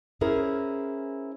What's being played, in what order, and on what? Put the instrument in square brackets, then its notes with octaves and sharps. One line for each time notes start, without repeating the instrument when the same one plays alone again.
[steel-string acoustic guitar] C#4 E4 G#4 A#4 C5